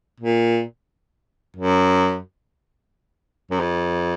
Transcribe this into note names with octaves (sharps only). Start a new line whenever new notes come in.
A#2
F#2
F#2
F2